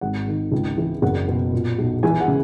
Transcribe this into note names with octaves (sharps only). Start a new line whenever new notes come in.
G#1 F#5
D#3
C#2
E3
F#1 F#5
B2
A#2
B1
E3 G#5
F#5
C#3